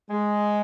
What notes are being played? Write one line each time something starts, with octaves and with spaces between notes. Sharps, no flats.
G#3